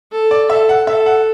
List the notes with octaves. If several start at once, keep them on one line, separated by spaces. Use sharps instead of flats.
A4
D5
A4 E5
F#5
A4 E5
F#5